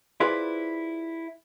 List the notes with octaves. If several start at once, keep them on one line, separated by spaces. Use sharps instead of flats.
E4 F4 G#4 B4 C5 D5